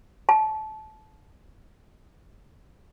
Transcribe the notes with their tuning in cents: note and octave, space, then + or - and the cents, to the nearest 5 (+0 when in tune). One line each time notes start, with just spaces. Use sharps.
A5 -25